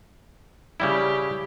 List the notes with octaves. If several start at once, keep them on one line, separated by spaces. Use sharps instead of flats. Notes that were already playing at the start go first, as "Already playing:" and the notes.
C#3 G3 E4 G4